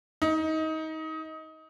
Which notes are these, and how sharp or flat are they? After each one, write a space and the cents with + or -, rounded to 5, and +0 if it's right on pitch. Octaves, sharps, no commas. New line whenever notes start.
D#4 +25